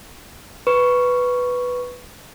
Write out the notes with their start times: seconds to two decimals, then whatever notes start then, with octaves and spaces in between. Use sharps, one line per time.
0.67 B4 C#6